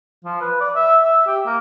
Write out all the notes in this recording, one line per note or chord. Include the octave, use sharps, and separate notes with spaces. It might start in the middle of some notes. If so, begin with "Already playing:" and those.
F3
B4
D5
E5
E5
G4
A#3